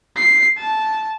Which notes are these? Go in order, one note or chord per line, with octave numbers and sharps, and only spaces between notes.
C7
A5